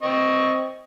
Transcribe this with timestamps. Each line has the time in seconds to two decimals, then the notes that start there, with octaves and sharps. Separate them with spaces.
0.02 C4 D#5 C#6